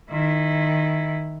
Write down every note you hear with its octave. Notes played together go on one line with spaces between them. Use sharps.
D#3 E4